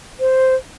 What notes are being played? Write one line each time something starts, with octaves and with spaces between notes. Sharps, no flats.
C5